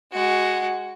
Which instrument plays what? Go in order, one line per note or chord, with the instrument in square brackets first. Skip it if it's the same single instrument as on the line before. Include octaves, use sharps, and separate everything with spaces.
[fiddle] G#3 F#4